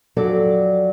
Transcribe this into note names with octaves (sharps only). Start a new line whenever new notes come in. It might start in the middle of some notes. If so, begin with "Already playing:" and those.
F2 F#3 A4 D5